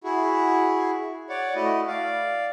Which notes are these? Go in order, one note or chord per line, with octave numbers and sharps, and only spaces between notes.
E4 F#4 G#4
C#5 D5 F#5
A3 E4 F#4 D#5
D5 F5